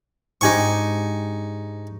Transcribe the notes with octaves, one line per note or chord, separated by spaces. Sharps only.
G#2 D4 D#4 G4 G#5 C#6